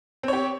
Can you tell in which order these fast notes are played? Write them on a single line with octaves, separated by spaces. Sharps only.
C4 C#5 G4